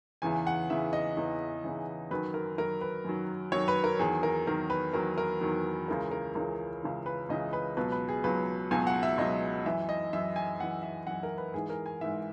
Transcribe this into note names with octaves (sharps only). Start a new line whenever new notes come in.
E2 C#3 E3 G#5
F#5
E2 C#3 E3 E5
D#5
E2 C#3 E3
E2 C#3 E3
F#2 D#3 F#3 B4
A#4
F#2 D#3 F#3 A#4
B4
F#2 D#3 F#3
F#2 D#3 F#3 C#5
B4
A#4
E2 D#3 F#3 G#4
A#4
E2 D#3 F#3 A#4
B4
E2 D#3 F#3 A#4
A#4
E2 D#3 F#3
C#2 C#3 E3 A#4
A#4
C#2 C#3 E3 A#4
C#2 C#3 E3
B4
C#2 C#3 E3 D#5
B4
C#2 B2 F#3 B4
B4
G#4
C#2 B2 F#3 B4
C#2 B2 F#3 G#5
F#5
E5
C#2 B2 F#3 D#5
F#2 E3 E5
D#5
F#2 E3 E5
G#5
F#2 E3 F#5
E5
F#2 E3 F#5
A#4
B4
G#2 E3 G#4
A#4
G#5
G#2 E3 E5